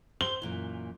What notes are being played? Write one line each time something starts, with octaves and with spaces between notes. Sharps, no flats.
C5 G7
F#2 A#2 E3